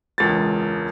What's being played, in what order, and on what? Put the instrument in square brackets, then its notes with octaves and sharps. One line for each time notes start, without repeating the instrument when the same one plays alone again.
[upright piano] E1 C#2 A6